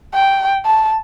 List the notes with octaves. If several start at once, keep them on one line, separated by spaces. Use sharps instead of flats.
G5
A5